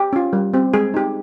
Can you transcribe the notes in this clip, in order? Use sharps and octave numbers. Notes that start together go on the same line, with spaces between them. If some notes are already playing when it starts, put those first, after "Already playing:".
Already playing: G4
C#4 F4
G3
C4 G4
G#3 G#4
D#4 G4